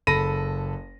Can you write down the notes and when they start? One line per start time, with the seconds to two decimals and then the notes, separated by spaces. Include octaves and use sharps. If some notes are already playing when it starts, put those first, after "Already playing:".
0.07 F#1 A4 B5 A#6 D#7